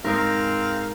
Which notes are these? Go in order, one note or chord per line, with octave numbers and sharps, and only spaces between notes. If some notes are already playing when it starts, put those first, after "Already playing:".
G#2 G#3 C4 D#4 A#4 F5